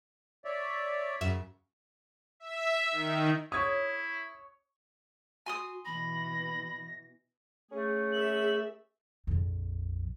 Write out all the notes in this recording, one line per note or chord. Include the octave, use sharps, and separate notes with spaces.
C#5 D5 E5
F#2 C#3 E5 E7
E5
D#3
E4 C#5 C#6 D#6 G#6
F#4 G#5 C6 D#6
B2 E3 B5 A#6
A3 C#4 G#4
G#4 A#4 E5 F#7
A#1 F2